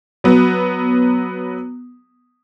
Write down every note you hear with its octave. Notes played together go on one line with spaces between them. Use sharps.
F#3 B3